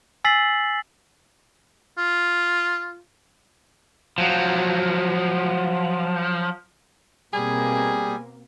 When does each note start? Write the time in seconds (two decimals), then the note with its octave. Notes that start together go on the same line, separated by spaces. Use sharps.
0.24 G#5 E6 A6 B6 C7 F#7
1.98 F4
4.18 F3 F#3
7.33 B2 G3 A#3 C4 G#4 G#5